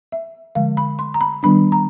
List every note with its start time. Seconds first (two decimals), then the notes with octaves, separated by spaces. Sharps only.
0.12 E5
0.55 D3 F3 G#3 F5
0.77 B5
0.99 C6
1.14 A#5
1.21 B5
1.43 D#3 G3 B3 D4 B5
1.72 A#5